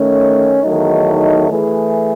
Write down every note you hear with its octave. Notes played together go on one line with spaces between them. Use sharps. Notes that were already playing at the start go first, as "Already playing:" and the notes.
Already playing: D#3 A3 C#4
E2 D#3 F#3 A3 D#4
E3 A3 E4 G#4